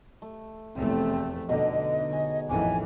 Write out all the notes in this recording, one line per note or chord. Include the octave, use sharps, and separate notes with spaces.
A3
F1 E2 A3 C4 C5 G5
B2 D3 D#4 D#5
G#4 C#5
A1 F2 D#3 E3 C#4 G#5 D6